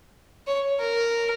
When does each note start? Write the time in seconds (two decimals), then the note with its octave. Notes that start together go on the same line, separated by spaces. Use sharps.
0.47 C#5
0.80 A#4